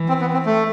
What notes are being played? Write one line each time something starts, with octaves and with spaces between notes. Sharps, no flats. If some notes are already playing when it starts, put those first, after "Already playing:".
Already playing: E3
C4
B3
C4
A3